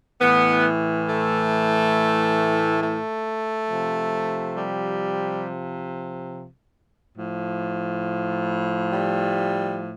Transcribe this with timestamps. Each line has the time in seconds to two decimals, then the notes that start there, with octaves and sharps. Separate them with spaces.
0.21 A2 E3 B3
1.08 A3
2.82 A3
3.69 C3 F3
4.56 G3
7.17 A2 F3
8.91 G3